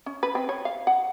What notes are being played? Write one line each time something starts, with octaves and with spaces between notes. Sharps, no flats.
C#4
B4
C4
C#5
F5
F#5